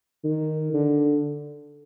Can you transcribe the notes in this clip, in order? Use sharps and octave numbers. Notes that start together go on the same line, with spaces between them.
D#3
D3